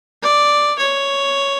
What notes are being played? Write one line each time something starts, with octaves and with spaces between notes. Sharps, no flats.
D5
C#5